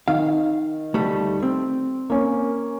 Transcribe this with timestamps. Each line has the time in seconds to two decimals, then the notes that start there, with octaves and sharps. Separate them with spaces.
0.08 D#3 F5
0.94 D2 G3 A3
1.43 C4
2.10 A#3 C#4